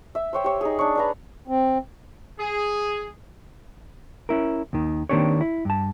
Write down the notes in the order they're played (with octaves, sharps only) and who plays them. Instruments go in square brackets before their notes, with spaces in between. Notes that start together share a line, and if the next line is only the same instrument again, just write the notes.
[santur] E5
C5 C#5 G5
G4 C#5
D#4 G#4
D4 C#5
D4 B4 A#5
[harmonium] C4
[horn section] G#4
[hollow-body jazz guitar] C#4 E4 A#4
D#2 D#3
D#3 A#3 C4 D4 G4 C#5
E4
G2 A5